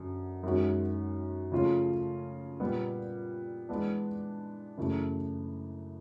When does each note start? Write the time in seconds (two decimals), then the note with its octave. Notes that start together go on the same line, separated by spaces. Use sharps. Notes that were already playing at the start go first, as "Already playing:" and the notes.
Already playing: F#2 D3 F#3
0.43 F#2 D#3 G#3 C#4 F#4
1.52 C#3 F3 A3 C#4 F4
2.60 A#2 G3 B3
3.69 E3 G#3 B3 D4
4.77 F#2 C#3 E3 A3